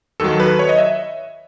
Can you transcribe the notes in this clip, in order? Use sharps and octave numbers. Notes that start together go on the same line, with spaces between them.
D#2 D#3 F#3 A4
B4
C#5
D#5
E5